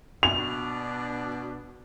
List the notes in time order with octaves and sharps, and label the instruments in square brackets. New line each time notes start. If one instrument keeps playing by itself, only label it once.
[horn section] B2 D4 [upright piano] F7